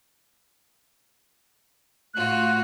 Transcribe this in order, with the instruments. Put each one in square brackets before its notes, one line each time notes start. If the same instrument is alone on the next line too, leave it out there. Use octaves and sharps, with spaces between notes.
[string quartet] A2 F4 F#4 [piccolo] F#6